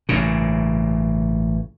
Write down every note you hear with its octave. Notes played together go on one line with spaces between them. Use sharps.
A1 G2 A#2 C#3